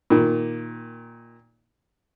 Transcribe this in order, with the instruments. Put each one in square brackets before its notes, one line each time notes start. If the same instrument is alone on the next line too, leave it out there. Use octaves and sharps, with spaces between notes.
[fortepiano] A#2 D#3